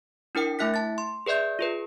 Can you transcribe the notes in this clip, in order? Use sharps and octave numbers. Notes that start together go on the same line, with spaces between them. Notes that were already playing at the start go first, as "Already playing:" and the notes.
D4 E4 A#4 G5 C#7
A3 E4 E5 F#6 B6
A5 A6
C6
G#4 B4 D5 E5 G6
F4 G#4 B4